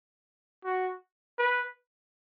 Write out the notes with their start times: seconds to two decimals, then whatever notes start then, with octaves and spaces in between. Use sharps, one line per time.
0.65 F#4
1.39 B4